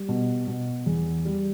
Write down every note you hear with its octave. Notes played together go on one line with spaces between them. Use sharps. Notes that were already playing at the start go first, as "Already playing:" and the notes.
Already playing: G3
B2
B2
E2
G3